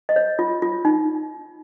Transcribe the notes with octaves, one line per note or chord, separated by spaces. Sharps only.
D#5
C#5
F4
F4
D#4